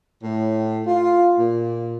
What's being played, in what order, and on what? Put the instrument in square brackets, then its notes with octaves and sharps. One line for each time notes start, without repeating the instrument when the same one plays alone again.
[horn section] A2
F4
A#2